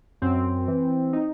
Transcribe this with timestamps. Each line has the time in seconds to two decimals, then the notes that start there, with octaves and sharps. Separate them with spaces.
0.22 F#2 C4
0.68 E3
1.13 D#4